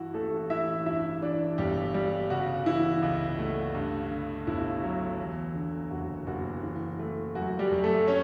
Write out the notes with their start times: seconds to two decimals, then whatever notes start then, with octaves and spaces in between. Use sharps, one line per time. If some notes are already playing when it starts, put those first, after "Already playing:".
Already playing: G2 E3 E4 F#4
0.14 A1 A3 A4
0.50 A1 E4 E5
0.86 G2 E4 E5
1.22 E3 D4 D5
1.58 G1 G3 G4
1.94 G3 G4
2.30 C#3 F#4
2.66 E3 E4
3.03 C#2
3.39 A3
3.75 G2
4.11 D3
4.47 G1 E4
4.83 F#3
5.19 E2
5.55 D3
5.91 F#1 F#4
6.27 F#1 F#4
6.63 E3
6.99 A3
7.35 F#2 F#4
7.59 G3 G4
7.71 F#2
7.84 A3 A4
8.07 C#4 C#5